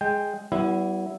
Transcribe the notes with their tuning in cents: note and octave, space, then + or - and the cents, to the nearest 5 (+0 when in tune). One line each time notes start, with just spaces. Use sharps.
G#3 +0 G5 +10
G3 -45 B3 +0 E4 +0